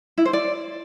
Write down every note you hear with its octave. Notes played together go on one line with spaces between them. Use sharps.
E4
C5
D5